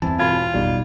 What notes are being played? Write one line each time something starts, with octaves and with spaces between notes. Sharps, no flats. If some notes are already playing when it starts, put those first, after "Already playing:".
E2 G2 E3 C4 E4 A5
E1 F4 B5 G#6
A1 B2 G3 D#4